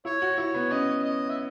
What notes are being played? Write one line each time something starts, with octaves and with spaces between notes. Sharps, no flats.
E4 C#5
F#4
E4 C#5
B3
C#4 D#5
D#5
E5